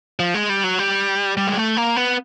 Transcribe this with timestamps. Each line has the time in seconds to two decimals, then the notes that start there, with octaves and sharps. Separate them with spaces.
0.19 F3
0.34 G#3
0.49 G3
0.64 F#3
0.79 G3
1.37 G3
1.47 G#3
1.57 A3
1.77 A#3
1.96 B3